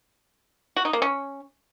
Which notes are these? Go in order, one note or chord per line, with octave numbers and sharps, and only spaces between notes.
F#4
D#4
A#3
C#4